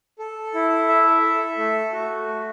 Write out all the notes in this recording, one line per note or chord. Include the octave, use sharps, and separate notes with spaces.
A4
E4
E5
A4
A3
F#4
A3